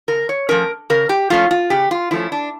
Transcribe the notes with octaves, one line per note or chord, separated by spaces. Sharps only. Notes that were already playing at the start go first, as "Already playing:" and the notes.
C#3 A#4
C#5
F3 A3 C#4 A#4
C#3 A#4
G4
F3 A3 C#4 F4
F4
C#3 G4
F4
F3 A3 C#4 E4
D4